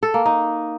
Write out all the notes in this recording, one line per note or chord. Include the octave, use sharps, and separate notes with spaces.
A4
A#3
D#4